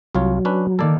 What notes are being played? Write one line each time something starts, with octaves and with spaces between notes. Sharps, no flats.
C2 F#3 F4 C#5
C#4 D4 B4
D#3 A#3 A4 D5